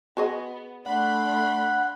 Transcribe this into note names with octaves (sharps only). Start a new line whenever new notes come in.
B3 F#4 G#4 D#5
A3 D4 F#5 B5 C6